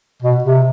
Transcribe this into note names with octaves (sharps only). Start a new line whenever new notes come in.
B2
C3